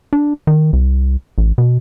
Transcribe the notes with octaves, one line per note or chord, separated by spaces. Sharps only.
D4
D#3
C2
A1
B2